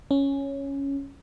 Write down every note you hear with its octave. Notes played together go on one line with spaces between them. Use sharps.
C#4